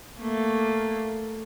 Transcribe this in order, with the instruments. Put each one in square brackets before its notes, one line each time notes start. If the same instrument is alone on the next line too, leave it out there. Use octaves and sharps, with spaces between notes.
[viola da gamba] A3 A#3